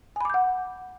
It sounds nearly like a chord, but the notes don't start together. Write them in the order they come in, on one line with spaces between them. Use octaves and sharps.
G#5 B5 D6 G6 F#5